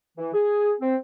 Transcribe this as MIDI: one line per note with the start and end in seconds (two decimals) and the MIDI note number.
0.18 0.33 52
0.34 0.73 68
0.81 0.96 60